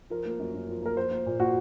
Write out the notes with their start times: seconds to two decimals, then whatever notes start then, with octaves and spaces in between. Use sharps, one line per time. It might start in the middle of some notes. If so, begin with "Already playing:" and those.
0.10 F3 A#4
0.25 A#3
0.39 F#2
0.54 F#2
0.68 F3
0.82 A#3 A#4
0.97 F3 C5
1.11 A#3
1.26 A#2
1.39 A#2 F#4